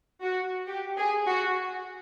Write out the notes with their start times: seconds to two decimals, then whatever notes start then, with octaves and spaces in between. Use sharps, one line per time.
0.22 F#4
0.67 G4
0.97 G#4
1.27 F#4